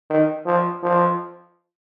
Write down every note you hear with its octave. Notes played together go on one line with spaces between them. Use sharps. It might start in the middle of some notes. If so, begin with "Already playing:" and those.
D#3
F3
F3